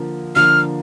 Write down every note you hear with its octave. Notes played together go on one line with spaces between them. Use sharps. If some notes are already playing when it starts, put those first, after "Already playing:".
Already playing: D3 F3 A#3
D3 F3 A#3 F6